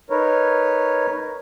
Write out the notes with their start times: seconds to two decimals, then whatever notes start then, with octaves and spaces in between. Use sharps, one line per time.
0.10 D#4 A#4 B4 C#5